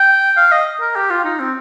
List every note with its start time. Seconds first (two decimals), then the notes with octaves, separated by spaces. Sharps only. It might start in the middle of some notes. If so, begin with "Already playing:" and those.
Already playing: G5
0.37 F5
0.51 D#5
0.81 A#4
0.96 G4
1.10 F4
1.24 D#4
1.40 C4